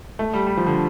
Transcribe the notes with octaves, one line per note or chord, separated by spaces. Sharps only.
A3
G3
G3
F3
D3